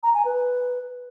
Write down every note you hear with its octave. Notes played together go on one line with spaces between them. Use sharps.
A#5
G#5
B4